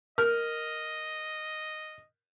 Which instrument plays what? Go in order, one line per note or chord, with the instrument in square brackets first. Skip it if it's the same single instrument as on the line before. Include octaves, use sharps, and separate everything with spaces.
[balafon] A#4 [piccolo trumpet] D#5 [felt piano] F6